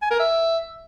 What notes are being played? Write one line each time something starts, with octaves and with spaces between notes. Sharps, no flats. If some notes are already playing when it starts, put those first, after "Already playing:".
G#5
A#4
E5